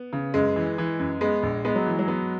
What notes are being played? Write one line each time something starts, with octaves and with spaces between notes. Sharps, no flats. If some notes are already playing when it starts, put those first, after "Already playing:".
Already playing: B3
C#3
F#2 G#3
E3
E3
F#2
G#3 B3
A#1
G#3 B3
F#3
E3
F#3
B3